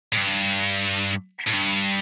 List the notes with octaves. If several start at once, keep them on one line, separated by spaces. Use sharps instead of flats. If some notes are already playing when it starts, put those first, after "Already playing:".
A2
G2
A2
G2